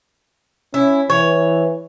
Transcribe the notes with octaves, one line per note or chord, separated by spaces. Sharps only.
C#4 E4
E3 C#5